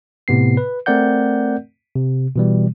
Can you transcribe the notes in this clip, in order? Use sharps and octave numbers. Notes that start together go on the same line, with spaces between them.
A2 C3 B3 C7
B4
A3 C4 A#4 D5 F#5 G6
C3
B2 E3 G3